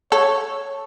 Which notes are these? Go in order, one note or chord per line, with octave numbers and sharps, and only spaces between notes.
A4 C#5